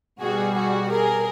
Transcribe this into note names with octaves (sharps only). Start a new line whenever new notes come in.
B2 G3 F#4 G#4
F#4 G#4
G#4 A#4